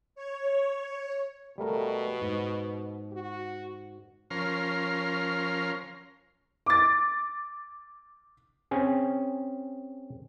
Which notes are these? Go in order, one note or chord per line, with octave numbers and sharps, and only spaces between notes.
C#5
B2 G3 A3 A#4
G#2
F#4
F3 C#4 A#4 C6 F6
D6 A6
C4 C#4 G#4